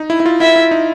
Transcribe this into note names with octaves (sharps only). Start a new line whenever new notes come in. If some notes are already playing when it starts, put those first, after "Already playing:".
Already playing: D#4
E4
E4
F4
E4 E5
E4
D#4